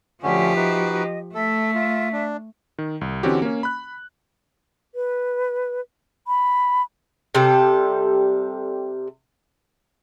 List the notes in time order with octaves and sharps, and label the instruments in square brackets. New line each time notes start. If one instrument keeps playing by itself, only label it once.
[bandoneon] D2 D3 C#4 [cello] F3 G4 [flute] E5
[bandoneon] D#4 F#4 B4
[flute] D#5
[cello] A3 [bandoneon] A4 [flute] E5
[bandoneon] F4
D4
[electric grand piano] D#3
C2
D3 E3 C4 C#4 F#4 G4
A#3 C#4
B5 F#6
[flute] B4
B5
[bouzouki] C3 G3 A4